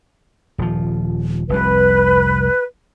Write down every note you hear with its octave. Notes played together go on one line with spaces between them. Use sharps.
D#1 F3
F1 C2 C3 B4